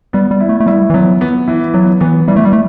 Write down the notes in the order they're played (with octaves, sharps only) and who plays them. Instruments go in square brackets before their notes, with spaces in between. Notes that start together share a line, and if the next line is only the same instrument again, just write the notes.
[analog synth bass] G3 [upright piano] B3
[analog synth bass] G3
[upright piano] E4
[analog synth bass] A3
A3
[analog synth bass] G3 [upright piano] E4
[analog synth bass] E3
[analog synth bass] F#3 [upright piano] B3
[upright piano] B3
E3
[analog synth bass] F#3 [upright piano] B3
[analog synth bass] E3 [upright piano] B3
[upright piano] E3 [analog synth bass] G3
[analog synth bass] A3
G3
A3